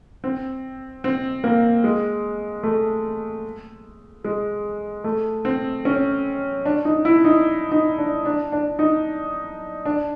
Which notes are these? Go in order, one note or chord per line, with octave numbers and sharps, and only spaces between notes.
C4
C4
A#3
G#3
A3
G#3
A3
C4
C#4
D4
D#4
E4
D#4
D#4
D4
D4
D4
D#4
D4